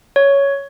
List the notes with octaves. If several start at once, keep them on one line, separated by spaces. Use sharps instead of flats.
C#5